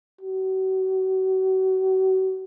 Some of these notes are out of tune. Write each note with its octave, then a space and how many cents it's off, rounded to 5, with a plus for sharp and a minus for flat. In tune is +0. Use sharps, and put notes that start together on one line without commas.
F#4 +35